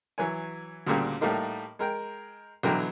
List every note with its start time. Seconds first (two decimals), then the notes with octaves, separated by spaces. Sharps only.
0.18 E3 F#3 C#5 G#5
0.87 D2 A#2 C#3 G3 A#3
1.21 A2 G3 A3 A#3 D#4
1.79 G#3 A#4 G5
2.63 B1 D3 E3 F#3 G5 A#5